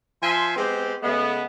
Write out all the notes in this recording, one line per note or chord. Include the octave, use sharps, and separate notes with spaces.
F3 E5 G#5 C6
G#3 B3 C4 G4 C5
C#3 G#3 A3 B3